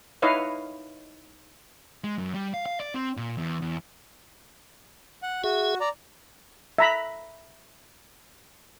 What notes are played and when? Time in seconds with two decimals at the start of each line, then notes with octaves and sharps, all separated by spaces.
0.22 D#4 E4 B4 C#5 D#5 F5
2.04 G#3
2.18 F#2
2.34 G3
2.54 F5
2.66 F5
2.80 D5
2.94 C4
3.17 A#2
3.37 E2
3.62 E2
5.23 F#5
5.44 F#4 G#4 E5
5.80 D5 A#5
6.78 E5 A#5 B5